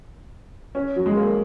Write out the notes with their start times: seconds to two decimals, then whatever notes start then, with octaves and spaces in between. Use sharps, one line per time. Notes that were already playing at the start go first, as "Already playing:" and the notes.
0.75 C#4
0.96 F#3
1.06 G#3
1.16 A#3